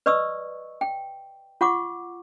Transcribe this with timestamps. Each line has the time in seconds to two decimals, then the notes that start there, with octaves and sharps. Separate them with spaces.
0.06 B4 D5 D#5 C#6 D#6 E6
0.81 G5
1.61 F4 F#5 C#6 D6